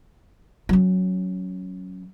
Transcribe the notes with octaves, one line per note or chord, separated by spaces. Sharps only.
F#3 C#4